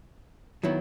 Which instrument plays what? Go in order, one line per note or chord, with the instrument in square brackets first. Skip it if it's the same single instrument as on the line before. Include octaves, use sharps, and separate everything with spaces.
[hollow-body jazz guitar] D#3 F#3 B3 E4